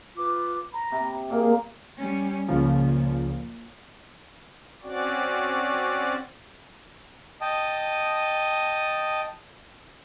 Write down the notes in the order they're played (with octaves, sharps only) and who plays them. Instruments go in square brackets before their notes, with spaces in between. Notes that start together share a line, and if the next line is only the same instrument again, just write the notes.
[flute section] F4 B4 D6
A#5 B5
[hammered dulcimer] C3
[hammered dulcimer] A#2 A#3 A#4 [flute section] G#4
[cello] G3 C#4
[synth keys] C#2 C#3 F3 [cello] A#2
[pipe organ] C4 C#4 F#4 D5
[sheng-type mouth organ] D#5 G5 A5 D#6